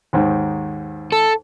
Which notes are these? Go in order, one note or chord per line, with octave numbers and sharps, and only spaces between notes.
D#2 G#2 D#3
A4